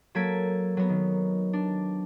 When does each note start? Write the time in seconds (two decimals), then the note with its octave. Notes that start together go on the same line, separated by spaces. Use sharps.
0.15 F#3 A#3 A4 G#6 B6 D7
0.77 F#3 B3
0.89 D#3
1.53 D4